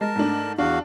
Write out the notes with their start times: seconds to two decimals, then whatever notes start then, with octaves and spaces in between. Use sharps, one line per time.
0.01 G#3 A#4 A5
0.16 G#2 A3 D4
0.58 E2 D4 F#4 F5